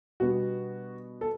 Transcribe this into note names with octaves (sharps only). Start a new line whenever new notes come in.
B2 G3 B3 D4 F#4
A4